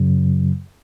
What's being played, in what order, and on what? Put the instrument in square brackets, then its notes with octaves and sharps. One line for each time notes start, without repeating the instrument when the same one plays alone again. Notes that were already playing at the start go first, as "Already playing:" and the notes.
Already playing: [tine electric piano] F#2 C#3 F#3